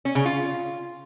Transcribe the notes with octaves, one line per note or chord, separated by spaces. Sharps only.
C#4
C#3
F4